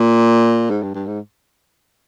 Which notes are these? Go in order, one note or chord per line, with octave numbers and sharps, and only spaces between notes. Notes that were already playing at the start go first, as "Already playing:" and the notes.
Already playing: A#2
G#2
G2
G2
G#2